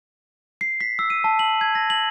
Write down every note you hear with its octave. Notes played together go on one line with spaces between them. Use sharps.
C7
B6
E6
D#7
A5
F#7
G#6
A#6
F#7